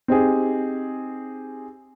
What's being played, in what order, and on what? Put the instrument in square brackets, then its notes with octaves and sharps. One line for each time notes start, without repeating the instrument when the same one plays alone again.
[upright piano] C4 D#4 G4 G#4